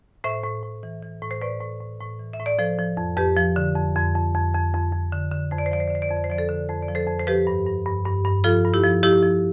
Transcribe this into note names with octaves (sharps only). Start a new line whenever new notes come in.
A2 C5 E5
A2
A2
E3
E3
A2
C5
A2 B4 D5
A2
A2
A2
E3
E5
A2
D5
F3 A4 C5
F3
F2
F2 G4 B4
F3
D3
F2
F2
F2
F2
F2
F2
F2
D3
D3
F2 C5
D5
C5
F3 D5
C5
D5
D3 C5
D5
F2 C5
D5
C5
F3 D5
A4 C5
D3
F2 C5
D5
F3
A4 C5
F2
C5
F3 G4 B4
G2
G2
G2
G2
G2
F3 F4 A4
G2
E4 G4
F3
F3 E4 G4
F3